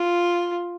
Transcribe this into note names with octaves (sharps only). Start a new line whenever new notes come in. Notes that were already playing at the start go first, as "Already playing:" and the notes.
Already playing: F4